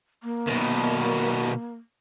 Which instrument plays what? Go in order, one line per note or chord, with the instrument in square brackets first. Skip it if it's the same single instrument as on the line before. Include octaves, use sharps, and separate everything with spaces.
[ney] A#3
[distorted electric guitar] B2 D#3